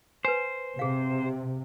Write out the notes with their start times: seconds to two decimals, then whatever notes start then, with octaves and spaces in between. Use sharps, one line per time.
0.25 B4 C5 G#5
0.79 C3 G#4 F5